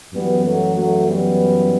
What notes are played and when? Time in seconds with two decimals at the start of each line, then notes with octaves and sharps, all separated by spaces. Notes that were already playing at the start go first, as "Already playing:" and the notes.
0.14 F#2 E3 G3 B3
0.45 F#3 A3
0.75 F#3 A3
1.06 G3 B3